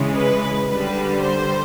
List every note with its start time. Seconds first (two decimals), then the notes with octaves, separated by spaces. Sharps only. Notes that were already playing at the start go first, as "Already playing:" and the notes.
Already playing: C#3 E3 G#3
0.14 B4
0.68 D3 G3 B4
1.22 C5